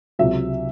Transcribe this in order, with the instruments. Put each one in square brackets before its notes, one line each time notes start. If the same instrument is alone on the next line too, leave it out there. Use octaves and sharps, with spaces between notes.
[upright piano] C#2 C3 F#3 E5